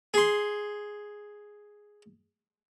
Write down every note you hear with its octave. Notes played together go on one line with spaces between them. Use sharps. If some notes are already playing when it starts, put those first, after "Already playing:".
G#4 C6